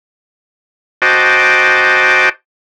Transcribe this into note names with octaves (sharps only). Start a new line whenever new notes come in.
F#4 C5 D#5 G5 A5 D6